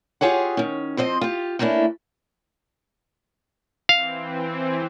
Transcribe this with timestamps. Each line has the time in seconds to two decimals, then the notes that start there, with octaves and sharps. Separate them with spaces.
0.21 F4 G4 G#4 C#5 F#5
0.57 D#3 C#4
0.97 F3 C4 C5 D#5
1.21 F4 G4
1.59 A3 A#3 C#4 D4 E4
3.89 E3 C4 F5